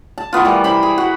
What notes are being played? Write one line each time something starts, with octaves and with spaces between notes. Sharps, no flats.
A5
E3 A3 B3 F4
G3 A#4
E4 C5 B5
G#4
F#4